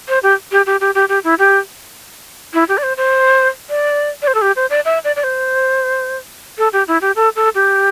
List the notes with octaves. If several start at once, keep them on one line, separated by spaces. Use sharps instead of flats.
C5
G4
G4
G4
G4
G4
G4
E4
G4
E4
G4
D5
C5
C5
D5
D5
C5
A4
G4
C5
D5
E5
D5
D5
C5
A4
G4
E4
G4
A4
A4
G4